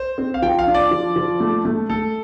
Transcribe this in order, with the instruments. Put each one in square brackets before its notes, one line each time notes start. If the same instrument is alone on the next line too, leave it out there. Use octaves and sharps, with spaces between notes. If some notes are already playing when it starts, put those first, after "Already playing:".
Already playing: [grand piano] C5
[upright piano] C4
[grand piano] F5
[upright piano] F3 [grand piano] G5
[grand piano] F5
[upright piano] D4
[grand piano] D5
[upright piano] F3
F3
A3
A3
[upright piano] A3 [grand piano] A4